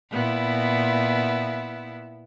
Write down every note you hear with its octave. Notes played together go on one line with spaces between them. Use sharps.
A#2 B3 E4